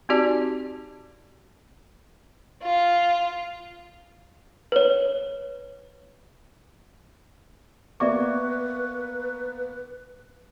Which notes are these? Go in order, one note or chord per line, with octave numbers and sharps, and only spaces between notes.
C4 D#4 F#4 G4 D5 A5
F4
B4 C#5
A#3 B3 B4 D5 E5 C#6 D6